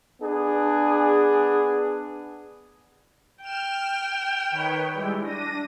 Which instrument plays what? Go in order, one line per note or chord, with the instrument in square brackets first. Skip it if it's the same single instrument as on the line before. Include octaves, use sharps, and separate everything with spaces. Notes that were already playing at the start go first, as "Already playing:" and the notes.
[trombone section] B3 D4 G#4
[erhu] G5 [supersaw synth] F6 E7
[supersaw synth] D#3 B4 C#5
G3 G#3 E4
D4 A#6 D#7